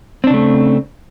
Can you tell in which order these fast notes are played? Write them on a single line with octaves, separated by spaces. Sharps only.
C4 D4 C#3 A3